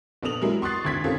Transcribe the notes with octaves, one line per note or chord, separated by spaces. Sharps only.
A#1 B3 A4 D#6 F7 F#7
F#3 G#3 E4 A#4
C6 C#6 D#6 F#6 A6 C7
G#1 D2 G#6 B6
D#3 C4 C#4 F4 A4